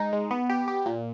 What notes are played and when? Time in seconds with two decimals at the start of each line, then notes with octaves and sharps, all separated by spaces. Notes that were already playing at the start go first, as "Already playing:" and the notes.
Already playing: G#3 D#4
0.13 G#3
0.31 B3
0.50 G4
0.68 G4
0.86 A#2